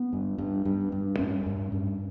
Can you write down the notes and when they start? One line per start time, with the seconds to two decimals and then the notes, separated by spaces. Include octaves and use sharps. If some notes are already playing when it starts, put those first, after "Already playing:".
Already playing: B3
0.13 G2
0.38 G2
0.65 G2
0.92 G2
1.19 G2 C#4
1.46 G2
1.72 G2